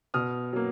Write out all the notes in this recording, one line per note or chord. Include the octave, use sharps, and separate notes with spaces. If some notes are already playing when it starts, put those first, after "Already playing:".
B2 D#6 F6
F#3 A#3